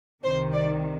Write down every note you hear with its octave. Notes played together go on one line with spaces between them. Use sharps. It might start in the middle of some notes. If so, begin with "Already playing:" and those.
C2 C3 D#3 C5
D5